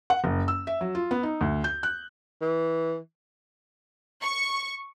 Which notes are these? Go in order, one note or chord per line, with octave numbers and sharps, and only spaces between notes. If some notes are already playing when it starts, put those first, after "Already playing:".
F#5
F#1
E6
E5
F#3
F4
B3
D#4
D2
G6
F#6
E3
C#6